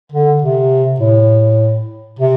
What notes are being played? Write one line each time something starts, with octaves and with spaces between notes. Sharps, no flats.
D3
C3
A2
C3